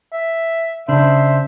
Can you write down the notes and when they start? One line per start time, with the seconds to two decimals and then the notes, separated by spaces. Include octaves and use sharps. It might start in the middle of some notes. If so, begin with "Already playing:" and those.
0.13 E5
0.88 C#3 D4 C5 E5